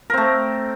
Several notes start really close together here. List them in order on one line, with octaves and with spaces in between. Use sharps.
A#4 C4 A3